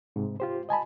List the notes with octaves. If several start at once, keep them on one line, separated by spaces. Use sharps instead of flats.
G#2 C3
F4 G4 C5
D#5 G#5 A5 B5